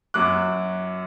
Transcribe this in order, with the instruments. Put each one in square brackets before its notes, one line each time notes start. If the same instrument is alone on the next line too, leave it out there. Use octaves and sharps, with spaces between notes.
[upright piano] F#2 F#3 D6 F#6